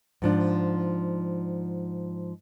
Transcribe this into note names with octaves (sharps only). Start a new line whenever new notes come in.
G#2 F3 D4